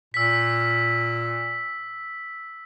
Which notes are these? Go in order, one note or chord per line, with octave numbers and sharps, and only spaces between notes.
A#2 E6 B6